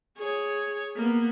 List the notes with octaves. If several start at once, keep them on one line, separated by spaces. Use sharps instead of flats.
G#4 C#5
A#3 B3